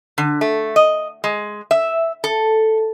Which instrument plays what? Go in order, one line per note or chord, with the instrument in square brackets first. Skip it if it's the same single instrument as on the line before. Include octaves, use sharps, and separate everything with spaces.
[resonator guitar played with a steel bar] D3
A3
D#5
G#3
E5
A4